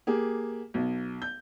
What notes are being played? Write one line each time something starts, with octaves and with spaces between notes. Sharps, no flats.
A#3 G4 G#4
B1
G6